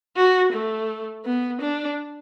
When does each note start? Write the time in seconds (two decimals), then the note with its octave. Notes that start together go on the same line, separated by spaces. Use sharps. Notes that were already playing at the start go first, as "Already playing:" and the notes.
0.16 F#4
0.52 A3
1.25 B3
1.61 D4